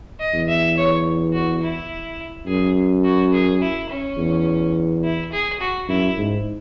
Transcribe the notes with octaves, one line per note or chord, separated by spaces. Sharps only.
D#5
E2
E5
C#5
F#4
E4
F#2 G#4
F#4
G#4
E4
C#4
E2
E4
G#4
F#4
F#2 E4
G#2